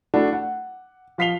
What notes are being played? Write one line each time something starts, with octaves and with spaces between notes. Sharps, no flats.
A3 D4 E4 F#4
F#5
F3 F5 B6 C7 F7 G7